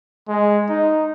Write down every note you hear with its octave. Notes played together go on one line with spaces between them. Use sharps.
G#3
D#4